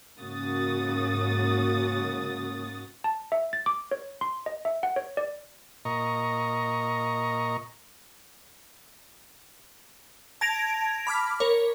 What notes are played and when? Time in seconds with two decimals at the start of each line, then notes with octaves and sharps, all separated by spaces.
0.19 G#2 C#3 A#3 F#4 D#6 A6
3.04 A5
3.32 E5
3.53 A6
3.66 D6
3.91 C#5
4.21 C6
4.46 D#5
4.65 E5
4.83 F#5
4.96 C#5
5.17 D5
5.85 A#2 D#5 A#5 C#6
10.41 A5 G#6 A#6 D7 F7
11.07 B5 D6 F6 B6
11.40 A#4 C#5